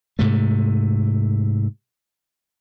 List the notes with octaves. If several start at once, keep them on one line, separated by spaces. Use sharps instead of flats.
G#2 C3 A3